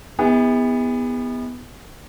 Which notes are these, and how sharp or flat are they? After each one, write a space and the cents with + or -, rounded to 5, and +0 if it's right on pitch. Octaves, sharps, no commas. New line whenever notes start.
B3 +0 E4 -45 G#4 -40